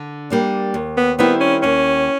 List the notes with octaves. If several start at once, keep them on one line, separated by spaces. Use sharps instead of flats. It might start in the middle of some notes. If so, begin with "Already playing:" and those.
Already playing: D3
G3 A#3 D4
D#2
B3
D#3 G3 B3 C4 E4
C#4
D#2 C#4